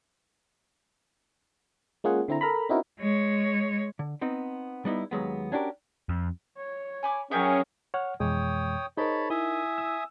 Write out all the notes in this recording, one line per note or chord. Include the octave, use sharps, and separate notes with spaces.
G#3 A#3 C#4 F4 G#4 F#5
D3 C4 E4 A#5
A4 A#4 A#5 B5
C4 C#4 D#4 E4 F#4 A#4
G#3 C#5
D3
B3 C4 D#4
G3 B3 D#4 E4
D#2 F#3 G#3 B3
C#4 D4 F#4 G4 A#4
F2
C#5
G#5 B5 D6
F#3 C#4 G#4 A#4 E5 F#5 G5
C#5 F#5 F6
F2 B2 E3 G#3 C#5 G5 D#6
D#4 G#4 A#4 C5 C#5 D#5 A5 B5
E4 E5 G#5 D#6
E6